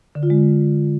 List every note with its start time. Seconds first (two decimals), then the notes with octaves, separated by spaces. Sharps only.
0.15 D3
0.23 F4
0.30 G#3